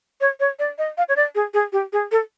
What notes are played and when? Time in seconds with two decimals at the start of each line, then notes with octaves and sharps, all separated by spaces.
0.21 C#5
0.40 C#5
0.59 D5
0.78 D#5
0.97 F5
1.09 C#5
1.16 D5
1.35 G#4
1.54 G#4
1.72 G4
1.93 G#4
2.11 A4